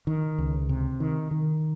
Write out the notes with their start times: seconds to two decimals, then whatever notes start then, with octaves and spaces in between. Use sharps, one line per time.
0.07 D#3
0.38 C#2
0.69 C3
1.00 D#3
1.31 D#3